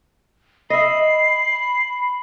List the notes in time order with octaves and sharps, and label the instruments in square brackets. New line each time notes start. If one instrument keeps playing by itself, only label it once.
[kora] D#5 E5 [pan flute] B5 [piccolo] C7